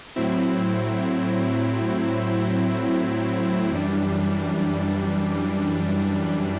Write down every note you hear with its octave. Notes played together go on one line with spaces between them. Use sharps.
A2 F#3 C4 E4
F#2 E3 G3 D4